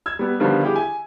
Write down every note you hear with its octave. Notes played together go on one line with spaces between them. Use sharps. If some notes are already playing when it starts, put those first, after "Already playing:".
E6 G#6
G3 B3
D3 D#3 F3 G3 B3
E4 G4 G#4
G#5